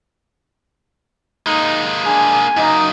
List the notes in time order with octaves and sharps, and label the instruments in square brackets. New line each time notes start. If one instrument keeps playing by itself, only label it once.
[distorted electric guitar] G#3 A#3 [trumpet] D#4
[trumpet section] D4 G#4 [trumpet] G#5
[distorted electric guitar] F#2 A#3 [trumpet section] D#4